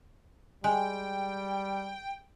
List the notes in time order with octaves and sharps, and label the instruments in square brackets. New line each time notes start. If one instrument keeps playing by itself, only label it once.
[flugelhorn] G3 [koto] G#3 [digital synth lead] G5